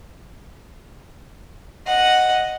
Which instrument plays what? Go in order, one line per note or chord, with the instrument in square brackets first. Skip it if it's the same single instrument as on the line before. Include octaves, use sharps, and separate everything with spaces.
[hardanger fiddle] D#5 F#5